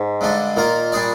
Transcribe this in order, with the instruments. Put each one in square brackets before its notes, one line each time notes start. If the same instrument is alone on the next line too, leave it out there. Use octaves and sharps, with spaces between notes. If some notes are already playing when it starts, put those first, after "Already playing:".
Already playing: [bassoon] G#2
[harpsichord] G2 D3 G#3 D4
[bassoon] A#2 [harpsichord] D#3 A#3 F4 A#4
[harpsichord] G3 D4 G#4 D5